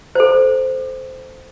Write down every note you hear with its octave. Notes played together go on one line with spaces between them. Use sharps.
A4 C5